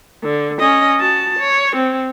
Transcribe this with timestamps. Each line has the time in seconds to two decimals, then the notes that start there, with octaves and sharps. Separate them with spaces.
0.24 D3
0.60 C#4 D#5
1.00 F#4 A5
1.39 C#5
1.76 C4